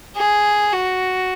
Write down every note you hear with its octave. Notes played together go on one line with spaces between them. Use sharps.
G#4
F#4